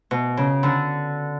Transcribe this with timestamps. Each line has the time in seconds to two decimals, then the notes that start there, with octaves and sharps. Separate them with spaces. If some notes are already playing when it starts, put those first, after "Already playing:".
0.11 B2
0.37 C#3
0.63 D3